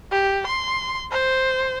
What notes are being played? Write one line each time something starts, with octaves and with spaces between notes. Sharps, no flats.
G4
C6
C5